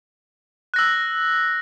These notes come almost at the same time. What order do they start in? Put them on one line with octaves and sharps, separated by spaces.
F#6 A#6 E6